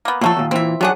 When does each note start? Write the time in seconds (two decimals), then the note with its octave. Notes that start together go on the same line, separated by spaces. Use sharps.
0.05 A#3 B3
0.21 A#2 F3 F#3 A3 A4
0.37 D#2 A#2
0.51 A#2 E3 C4 E5
0.81 D#3 F#3 D4 G#4 F#5